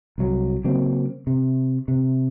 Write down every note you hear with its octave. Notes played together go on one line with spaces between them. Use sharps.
C2 F#3
C#3 F#3 A#3 C4
C3
C3